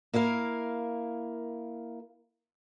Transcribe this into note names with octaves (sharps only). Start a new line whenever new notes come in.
A#3 E4 A#4 F5